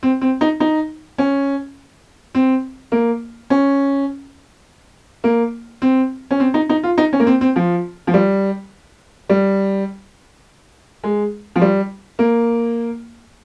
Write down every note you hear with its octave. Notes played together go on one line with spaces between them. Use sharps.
C4
C4
D#4
D#4
C#4
C4
A#3
C#4
A#3
C4
C#4
C4
D#4
D#4
F4
D#4
C#4
A#3
C4
C4
F3
F3
G3
G3
G#3
F3
G3
A#3